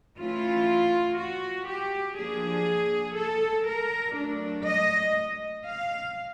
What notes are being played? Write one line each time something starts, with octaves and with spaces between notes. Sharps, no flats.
E3 A3 C#4 E4 F4
F#4
G4
F3 A#3 D4 G#4
A4
A#4
F#3 A3 D4
D#5
F5